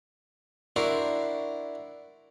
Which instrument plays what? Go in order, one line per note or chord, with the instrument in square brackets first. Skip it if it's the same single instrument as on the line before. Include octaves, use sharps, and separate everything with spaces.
[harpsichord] D4 E4 F#4 A#4 C5